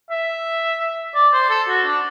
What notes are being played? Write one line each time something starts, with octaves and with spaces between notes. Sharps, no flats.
E5
D5
C5
A4
F#4
D4